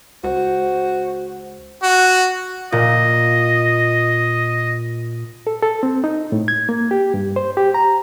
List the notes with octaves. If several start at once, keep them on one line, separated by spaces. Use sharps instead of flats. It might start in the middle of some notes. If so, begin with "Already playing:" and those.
C#2 F#4 C5
F#4
A#2 D#5
A4
A4
C4
D#4
A2
G#6
A#3
G4
G2
C5
G4
A#5